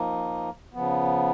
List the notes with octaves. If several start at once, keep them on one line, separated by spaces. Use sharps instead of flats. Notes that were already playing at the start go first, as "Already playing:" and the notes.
Already playing: F3 A#3 D#4
C#3 F3 B3